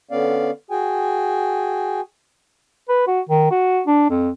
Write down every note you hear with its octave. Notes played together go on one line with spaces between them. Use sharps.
D3 B3 C#4 D5 F5
F#4 G#4 G5 G#5
B4
F#4
D#3
F#4
D4
F2